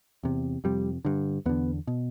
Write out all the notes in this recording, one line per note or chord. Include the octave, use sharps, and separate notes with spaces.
E2 C3
F2 C3 G3
G2 D3
E2 D3 B3
B2